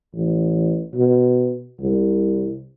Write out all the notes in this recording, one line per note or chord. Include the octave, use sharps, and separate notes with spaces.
A1
B2
C2